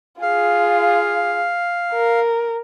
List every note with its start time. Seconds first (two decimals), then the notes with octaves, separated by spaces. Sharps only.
0.22 F4 G#4 F5
1.93 A#4